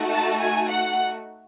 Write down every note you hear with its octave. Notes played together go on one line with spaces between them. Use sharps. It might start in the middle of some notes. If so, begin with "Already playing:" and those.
Already playing: A3 D#4 F#4
A5
G#5
F#5